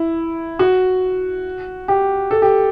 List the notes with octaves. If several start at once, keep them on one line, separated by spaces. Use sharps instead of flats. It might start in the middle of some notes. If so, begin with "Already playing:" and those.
Already playing: E4
F#4
G4
A4
G4